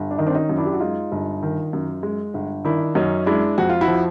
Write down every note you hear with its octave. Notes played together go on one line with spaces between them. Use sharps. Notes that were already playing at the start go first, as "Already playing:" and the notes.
Already playing: G1
D4
D#3 D#4
C4 D4
C#4 D#4
F#2
D4 E4
G4
F#4
G#3 D#4 F4
G1
D#3
F#2
G#3
G1
D#3 D4 E4
F#2 C#4 D#4
G#3 D4 E4
F2 F#4
F4
E4 F#4
F3